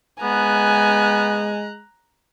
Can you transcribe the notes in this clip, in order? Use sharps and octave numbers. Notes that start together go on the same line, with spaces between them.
G#3 B3 G#5 A#5 F#6